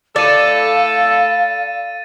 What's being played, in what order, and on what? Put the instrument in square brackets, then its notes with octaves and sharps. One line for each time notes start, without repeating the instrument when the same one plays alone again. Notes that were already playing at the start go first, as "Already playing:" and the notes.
[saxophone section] A3 E4 A4 [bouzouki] D5 [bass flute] F5 [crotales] A6 D#7